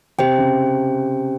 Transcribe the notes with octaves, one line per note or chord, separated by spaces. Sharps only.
C3 G4 C5 G5
C#3